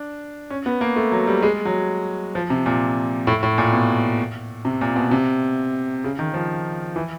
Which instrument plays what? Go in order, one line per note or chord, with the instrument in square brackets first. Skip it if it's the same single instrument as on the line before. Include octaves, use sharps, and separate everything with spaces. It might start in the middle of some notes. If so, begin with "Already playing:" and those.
Already playing: [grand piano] D4
C#4
B3
A#3
A3
F#3
G3
G#3
F#3
F3
C3
A#2
A2
A2
A#2
B2
C3
A#2
B2
C3
C#3
D#3
F3
E3